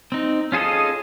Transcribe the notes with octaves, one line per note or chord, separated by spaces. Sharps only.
C4 D#4
C#4 F4 G#4 A4 D#5